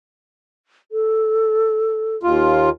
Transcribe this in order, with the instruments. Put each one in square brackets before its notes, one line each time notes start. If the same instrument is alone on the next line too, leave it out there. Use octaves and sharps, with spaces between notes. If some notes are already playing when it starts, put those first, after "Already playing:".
[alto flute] A4
[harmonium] D#2 F4